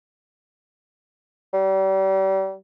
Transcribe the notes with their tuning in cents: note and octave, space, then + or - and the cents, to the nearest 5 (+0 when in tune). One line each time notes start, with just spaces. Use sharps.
G3 -35